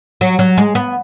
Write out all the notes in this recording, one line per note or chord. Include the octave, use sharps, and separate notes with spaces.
F#3
F#3
G#3
B3